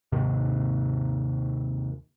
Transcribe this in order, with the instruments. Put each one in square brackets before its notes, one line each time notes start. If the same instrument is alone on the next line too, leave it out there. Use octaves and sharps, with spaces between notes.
[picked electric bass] D#2 G#2 C3 D#3